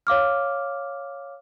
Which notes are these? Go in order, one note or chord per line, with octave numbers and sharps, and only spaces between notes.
C#5 F5 D6 F6